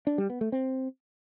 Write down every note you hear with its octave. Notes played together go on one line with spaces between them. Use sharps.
D4
G3
B3
A3
C4